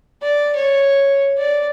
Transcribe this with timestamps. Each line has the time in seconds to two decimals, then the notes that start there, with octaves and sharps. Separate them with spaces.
0.23 D5
0.56 C#5
1.38 D5